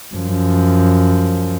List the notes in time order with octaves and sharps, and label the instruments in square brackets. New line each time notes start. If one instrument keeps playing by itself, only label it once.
[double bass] F#2 F3